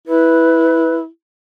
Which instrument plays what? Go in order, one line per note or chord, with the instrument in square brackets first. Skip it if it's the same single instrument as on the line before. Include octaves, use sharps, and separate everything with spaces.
[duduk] E4 [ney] B4